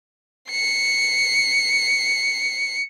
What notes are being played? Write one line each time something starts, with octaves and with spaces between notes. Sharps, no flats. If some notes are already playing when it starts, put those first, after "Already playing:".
C7 C#7